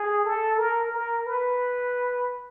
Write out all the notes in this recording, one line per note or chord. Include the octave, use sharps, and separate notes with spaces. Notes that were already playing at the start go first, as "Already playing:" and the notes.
Already playing: G#4
A4
A#4
A#4
B4